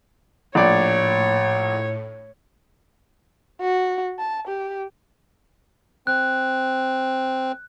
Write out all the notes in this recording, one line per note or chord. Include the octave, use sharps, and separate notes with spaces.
A#1 A2 C#5 D5
F#4
A5
G4
C4 F#6